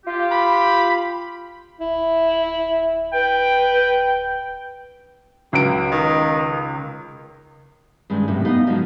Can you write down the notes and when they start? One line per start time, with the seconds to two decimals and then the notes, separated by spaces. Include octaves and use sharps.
0.06 F4 G4
0.31 B5
1.80 D1 E4
3.14 B4 G5
5.53 C#2 F#3 D7
5.92 D#3
8.10 G2 D#3 G#3 C#4
8.28 F#2 A2 C3
8.45 B3 D#4 D#5 F5
8.67 G#2 D3 F3 F#3